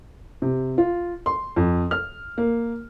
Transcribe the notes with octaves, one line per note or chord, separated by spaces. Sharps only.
C3
F4
C6
F2
F6
A#3